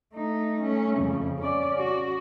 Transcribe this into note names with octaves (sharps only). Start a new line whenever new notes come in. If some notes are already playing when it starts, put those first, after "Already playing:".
A3 D#4
A3 C#4
F2 C#3
C#4 D5
F#4